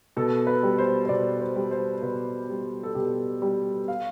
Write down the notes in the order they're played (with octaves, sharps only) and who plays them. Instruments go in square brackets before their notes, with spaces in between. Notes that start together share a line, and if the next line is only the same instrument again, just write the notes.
[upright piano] B2 A4
B4
G3
C5
C5
B2 D5
C5
G3
C5
B2 B4
G3
A4
B2 G4
G3
F5